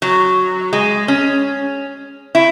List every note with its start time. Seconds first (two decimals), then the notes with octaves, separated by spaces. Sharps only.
0.02 F#3
0.73 G#3
1.08 C#4
2.35 E4